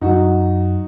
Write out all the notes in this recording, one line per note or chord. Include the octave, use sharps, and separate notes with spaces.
F#2 F#3 D#4 F#4